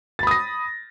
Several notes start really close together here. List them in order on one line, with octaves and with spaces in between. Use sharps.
A6 B5 D#6 A#6